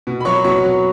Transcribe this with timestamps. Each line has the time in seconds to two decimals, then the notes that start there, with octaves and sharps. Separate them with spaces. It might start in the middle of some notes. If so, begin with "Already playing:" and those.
0.07 B2
0.20 B5
0.25 F#3 C#5 C#6
0.44 B2 C#5 C#6
0.64 F#3